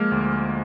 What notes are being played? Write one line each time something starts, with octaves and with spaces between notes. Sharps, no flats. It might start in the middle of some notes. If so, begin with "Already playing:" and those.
Already playing: F3 G#3 A#3 F6
D2